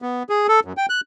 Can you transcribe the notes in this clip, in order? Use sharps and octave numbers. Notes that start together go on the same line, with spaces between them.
B3
G#4
A4
F#2
G5
F#6